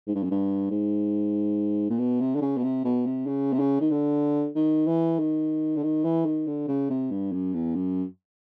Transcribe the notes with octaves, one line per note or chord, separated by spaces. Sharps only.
G#2
G2
F#2
G2
G#2
A#2
B2
C3
D3
C#3
B2
C3
B2
C3
C#3
C3
C#3
D#3
D3
D#3
E3
D#3
D3
D#3
E3
D#3
D3
C#3
C3
G2
F#2
E2
F#2